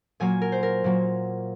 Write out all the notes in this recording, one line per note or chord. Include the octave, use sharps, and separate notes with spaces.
A#2 F#3 A#3 G#5
A#4
C5
A#4
A#2 F#3 A#3